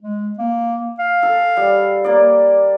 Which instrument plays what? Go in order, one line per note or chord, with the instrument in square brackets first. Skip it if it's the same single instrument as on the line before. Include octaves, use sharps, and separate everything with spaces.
[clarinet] G#3
A#3
F5
[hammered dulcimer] A4
G3
A#3 D5